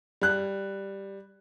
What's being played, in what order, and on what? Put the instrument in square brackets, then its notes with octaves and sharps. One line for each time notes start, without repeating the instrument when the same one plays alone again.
[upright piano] G3 F#6